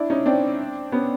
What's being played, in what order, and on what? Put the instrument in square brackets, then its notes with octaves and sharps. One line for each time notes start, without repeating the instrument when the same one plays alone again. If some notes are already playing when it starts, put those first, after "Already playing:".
Already playing: [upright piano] D4 E4
C#4 D#4
C4 D4
B3 C#4